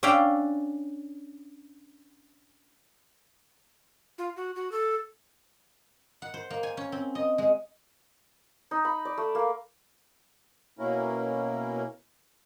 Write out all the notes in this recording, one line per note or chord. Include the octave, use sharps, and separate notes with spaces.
C#4 D4 E5 F5 G5 A#5
F4
F#4
F#4
A4
F#5
C5
A#3
G#5
C#4
C4
D#5
G#3
D#4
B5
D5
A3
A#3
B2 A#3 C#4 E4 A#4